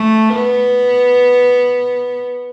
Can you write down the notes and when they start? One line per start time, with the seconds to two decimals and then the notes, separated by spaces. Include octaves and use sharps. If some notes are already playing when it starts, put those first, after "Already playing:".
Already playing: A3
0.34 B3